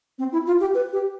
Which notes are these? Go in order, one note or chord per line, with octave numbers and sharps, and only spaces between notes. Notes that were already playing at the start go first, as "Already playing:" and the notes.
C4
E4
F4
G4
B4
G4